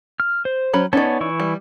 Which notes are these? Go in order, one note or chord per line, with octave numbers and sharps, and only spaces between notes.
F6
C5
F#3 C#4 B5
B3 C#4 D#4 C#5 D5 A5
E3 E4 C#6
G3